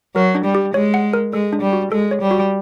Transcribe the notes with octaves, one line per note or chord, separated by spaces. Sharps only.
F#3 A#4
D4
G3
G4
G#3 C#5
F#5
A#4
G#3 A4
D4
G3
F#4
G#3 A4
C#5
G3
F#4